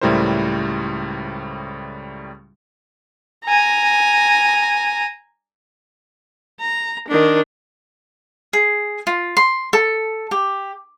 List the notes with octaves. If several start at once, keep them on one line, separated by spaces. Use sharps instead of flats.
C#2 A2 G3 E4 A#4 C5
G#5 A#5
A#5
D#3 D4
G#4
F4
C6
A4
G4